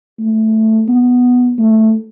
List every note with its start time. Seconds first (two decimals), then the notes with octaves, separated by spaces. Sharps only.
0.19 A3
0.88 B3
1.59 A3